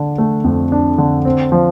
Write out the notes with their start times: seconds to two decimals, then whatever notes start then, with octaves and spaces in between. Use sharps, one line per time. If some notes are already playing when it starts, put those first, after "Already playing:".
Already playing: D3 D4
0.18 A3
0.45 F2
0.72 D4
0.98 D3
1.25 C4
1.52 F3